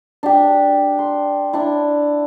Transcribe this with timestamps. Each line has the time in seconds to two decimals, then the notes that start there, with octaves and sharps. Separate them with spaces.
0.23 D4 G4
0.99 C6
1.53 D4 E4